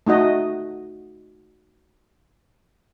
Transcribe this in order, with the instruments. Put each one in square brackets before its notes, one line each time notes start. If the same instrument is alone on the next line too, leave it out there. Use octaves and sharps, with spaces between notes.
[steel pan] A3 D#4 F#4 D#5